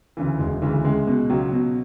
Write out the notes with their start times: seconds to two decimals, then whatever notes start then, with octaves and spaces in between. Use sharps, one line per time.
0.17 D2 C#3 E3
0.39 E1 G#3
0.62 D2 C#3 E3
0.84 C#2 G#3
1.07 B2
1.30 C#2 F#3
1.52 B2